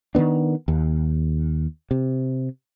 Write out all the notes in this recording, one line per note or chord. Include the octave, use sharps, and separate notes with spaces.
D#3 F3 B3 D4
D#2
C3